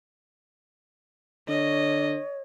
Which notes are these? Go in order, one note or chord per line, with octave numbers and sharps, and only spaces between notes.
D3 C#5 D#5